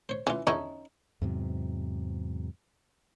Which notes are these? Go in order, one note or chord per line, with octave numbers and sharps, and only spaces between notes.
C5 C#5
E3 C#4 F4
E2 D3 C#4 D#4 E4
E2 G#2 C3 F#3